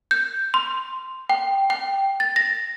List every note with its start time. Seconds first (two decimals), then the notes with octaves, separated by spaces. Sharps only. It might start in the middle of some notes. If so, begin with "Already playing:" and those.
0.11 G6
0.54 C6
1.29 G5
1.70 G5
2.20 A6
2.36 A#6